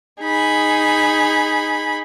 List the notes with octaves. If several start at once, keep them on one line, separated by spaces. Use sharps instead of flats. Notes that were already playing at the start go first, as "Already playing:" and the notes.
D#4 G#4 B5